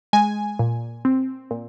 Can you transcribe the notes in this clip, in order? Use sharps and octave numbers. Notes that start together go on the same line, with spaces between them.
G#3 G#5
A#2
C4
A#2